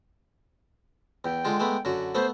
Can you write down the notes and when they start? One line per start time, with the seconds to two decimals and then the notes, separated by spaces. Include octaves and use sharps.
1.25 E2 G5
1.45 D3 G#3 F4
1.59 G#3 A3 B3
1.85 F#2 D3 F#4
2.15 A3 B3 C5